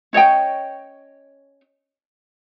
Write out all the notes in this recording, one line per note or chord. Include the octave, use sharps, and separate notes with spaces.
C#4 C#5 D#5 G5